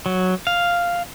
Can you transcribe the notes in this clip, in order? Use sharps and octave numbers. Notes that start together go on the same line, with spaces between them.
F#3
F5